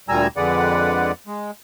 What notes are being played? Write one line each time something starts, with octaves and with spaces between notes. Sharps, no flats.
D2 A#2 G3 G#5 A#5 E6
F2 D3 G#3 B4 D5 F#5
G#3